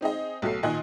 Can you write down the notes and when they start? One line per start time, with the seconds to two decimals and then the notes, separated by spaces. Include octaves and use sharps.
0.01 C4 D#4 G#4 D#5
0.42 B1 F#3 A3 C7
0.63 A#2 D#3 D#5 G#5 F#6